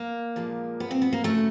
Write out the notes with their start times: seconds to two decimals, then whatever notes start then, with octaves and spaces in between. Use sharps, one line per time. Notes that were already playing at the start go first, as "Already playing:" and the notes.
Already playing: A#3
0.36 A#2 F3 G#3
0.80 B3
0.91 C4
1.02 B3
1.13 A#3
1.24 F#2 C#3 F#3 A3